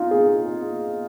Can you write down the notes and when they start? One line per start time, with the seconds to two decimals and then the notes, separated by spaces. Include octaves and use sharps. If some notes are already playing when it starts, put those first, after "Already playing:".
Already playing: D#4 F4
0.11 G#4